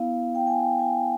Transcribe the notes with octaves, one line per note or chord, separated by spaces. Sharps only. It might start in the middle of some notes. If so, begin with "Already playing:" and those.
Already playing: B3 E4 F5
G5
G#5
G5
G#5